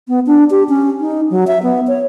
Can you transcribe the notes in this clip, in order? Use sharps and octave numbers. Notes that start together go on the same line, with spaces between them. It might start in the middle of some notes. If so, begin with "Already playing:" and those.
B3
D4
G4
C#4
D#4
F#3
E5
B3
C#5